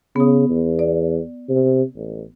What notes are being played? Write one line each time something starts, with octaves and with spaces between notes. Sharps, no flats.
C#3 B3 D#6
E2
D5
C3
A1